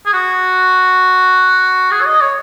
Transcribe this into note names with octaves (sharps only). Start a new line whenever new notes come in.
G#4
F#4
G#4
C#5
D#5
C#5